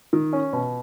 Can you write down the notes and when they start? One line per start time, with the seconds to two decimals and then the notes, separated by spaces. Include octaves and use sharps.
0.13 D#3
0.33 C#4
0.53 B2